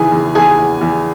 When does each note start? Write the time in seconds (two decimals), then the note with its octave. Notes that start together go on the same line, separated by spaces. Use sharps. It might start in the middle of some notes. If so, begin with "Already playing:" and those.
Already playing: E2 C#3 E3 G#4 G#5
0.12 E2
0.35 E2 G#4 G#5
0.59 E2
0.81 E2